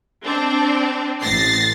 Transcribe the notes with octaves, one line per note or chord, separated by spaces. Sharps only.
C4 D4
A1 A6 A#6 C7